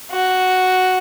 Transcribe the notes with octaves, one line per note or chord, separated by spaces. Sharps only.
F#4